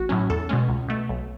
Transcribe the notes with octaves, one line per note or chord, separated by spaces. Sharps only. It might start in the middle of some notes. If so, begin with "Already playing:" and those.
Already playing: A1 F#4
A2 F#3 C#4
E2 A4
B2 G#3 C#4
C#2
B2 A3
B1